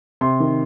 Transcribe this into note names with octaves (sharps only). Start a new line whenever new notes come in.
C3 C6
D#3